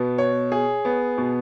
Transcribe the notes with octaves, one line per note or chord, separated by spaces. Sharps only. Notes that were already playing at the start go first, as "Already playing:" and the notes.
Already playing: B2 B3
C#5
G#4
B3
B2